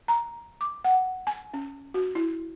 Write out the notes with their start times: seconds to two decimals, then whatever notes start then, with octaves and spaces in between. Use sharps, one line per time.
0.08 A#5
0.61 D6
0.84 F#5
1.27 G#5
1.54 C#4
1.94 F#4
2.15 E4